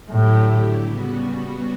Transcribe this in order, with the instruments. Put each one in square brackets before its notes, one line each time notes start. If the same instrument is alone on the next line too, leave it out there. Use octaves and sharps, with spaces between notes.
[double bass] A2 [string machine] D3 F#3 A3 E4 G4
[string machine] C#3 G3 B3 F#4